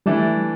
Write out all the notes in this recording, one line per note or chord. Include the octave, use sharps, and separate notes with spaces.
E3 G3 A3 D4